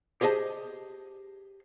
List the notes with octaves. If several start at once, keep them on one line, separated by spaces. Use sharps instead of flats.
G4 G#4 C5 D#5 A5